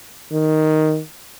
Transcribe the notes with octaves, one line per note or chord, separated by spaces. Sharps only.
D#3